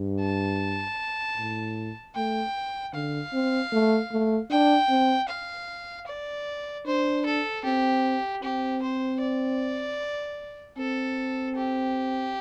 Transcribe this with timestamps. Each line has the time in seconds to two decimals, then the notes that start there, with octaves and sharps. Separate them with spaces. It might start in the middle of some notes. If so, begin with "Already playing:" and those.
Already playing: G2
0.20 A5
1.37 A2
2.15 A3 G5
2.93 D3 F5
3.33 C4
3.72 A3
4.12 A3
4.51 D4 G5
4.89 C4
5.29 F5
6.07 D5
6.86 D4 C5
7.26 A4
7.64 C4 G4
8.43 C4 G4
8.82 C5
9.20 D5
10.78 C4 A4
11.56 G4